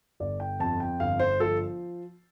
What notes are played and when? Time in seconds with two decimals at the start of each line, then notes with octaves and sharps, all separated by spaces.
0.20 G1 D5
0.40 G5
0.60 F2 A5
0.80 G5
1.00 G1 F5
1.19 C5
1.40 F3 A4